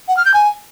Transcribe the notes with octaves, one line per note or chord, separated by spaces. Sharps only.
F#5
F6
G6
G#5